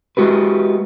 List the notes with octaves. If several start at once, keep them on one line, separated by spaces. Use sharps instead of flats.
G#3 F#4 G4 B4